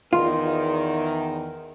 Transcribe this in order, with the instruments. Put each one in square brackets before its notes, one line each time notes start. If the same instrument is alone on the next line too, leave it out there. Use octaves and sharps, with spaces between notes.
[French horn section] E2 D#3 [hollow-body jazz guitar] F4